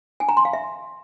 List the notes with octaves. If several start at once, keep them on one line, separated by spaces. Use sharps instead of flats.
G#5
A#5
C6
F5
E5